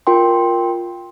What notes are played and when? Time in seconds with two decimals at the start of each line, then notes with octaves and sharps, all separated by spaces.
0.07 F4 A#4 G5 C6